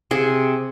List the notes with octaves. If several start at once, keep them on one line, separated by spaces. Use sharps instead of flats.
C3 G#4